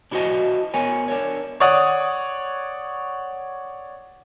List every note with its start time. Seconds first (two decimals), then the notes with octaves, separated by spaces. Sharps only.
0.11 D4 E4 F#4 C5 D#5 A5
0.74 B3 A#4 C#5 G#5
1.08 D4 A#4 C#5
1.60 C#5 D5 F#5 D#6